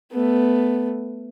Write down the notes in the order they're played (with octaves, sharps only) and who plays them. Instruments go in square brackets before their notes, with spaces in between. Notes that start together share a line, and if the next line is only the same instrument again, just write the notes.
[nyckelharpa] A3 B3